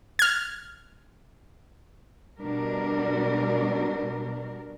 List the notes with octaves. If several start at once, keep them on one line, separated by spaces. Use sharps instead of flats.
F6 G#6
B2 G3 D4 A#4